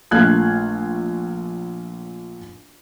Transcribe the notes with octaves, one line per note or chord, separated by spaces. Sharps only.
A#1 F3 A3 F5 F#6 G#6